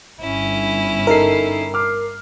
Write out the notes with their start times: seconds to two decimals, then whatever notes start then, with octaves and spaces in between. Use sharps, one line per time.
0.20 G1 C#4 E4
1.07 D#4 A4 A#4 C7
1.74 D6 F6